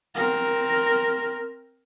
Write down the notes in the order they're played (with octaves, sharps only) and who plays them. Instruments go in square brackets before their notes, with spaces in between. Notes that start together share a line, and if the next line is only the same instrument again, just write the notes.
[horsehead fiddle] C4 A#4